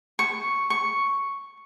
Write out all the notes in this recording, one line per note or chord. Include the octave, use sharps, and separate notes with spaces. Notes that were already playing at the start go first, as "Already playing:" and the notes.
C#6
C#6